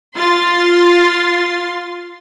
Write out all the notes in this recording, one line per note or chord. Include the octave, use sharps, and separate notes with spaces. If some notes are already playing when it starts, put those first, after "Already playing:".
F4 C6 A6